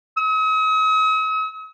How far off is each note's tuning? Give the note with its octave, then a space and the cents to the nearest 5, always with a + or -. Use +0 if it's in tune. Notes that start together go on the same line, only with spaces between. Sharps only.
D#6 +45